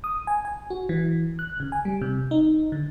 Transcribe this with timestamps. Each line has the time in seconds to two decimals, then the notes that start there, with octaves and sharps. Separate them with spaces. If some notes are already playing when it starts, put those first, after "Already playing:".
0.04 D#6
0.27 G#5
0.45 G#5
0.70 F#4
0.89 E3
1.39 F#6
1.60 C#3
1.72 G#5
1.85 G3
2.01 C3
2.31 D#4
2.72 D3